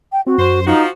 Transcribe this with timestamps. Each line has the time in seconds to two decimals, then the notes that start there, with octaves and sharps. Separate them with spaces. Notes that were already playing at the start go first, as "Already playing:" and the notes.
0.12 G5
0.27 C4 F#4
0.38 F#2 C5
0.66 F3 D#4 F#4